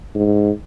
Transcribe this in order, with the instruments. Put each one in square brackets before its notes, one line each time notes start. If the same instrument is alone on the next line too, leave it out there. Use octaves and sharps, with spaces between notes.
[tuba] G#2